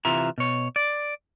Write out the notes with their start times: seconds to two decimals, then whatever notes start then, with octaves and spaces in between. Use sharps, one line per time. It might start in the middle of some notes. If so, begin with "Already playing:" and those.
0.05 C3 E3 F4 E5 A#5
0.38 B2 C#5
0.76 D5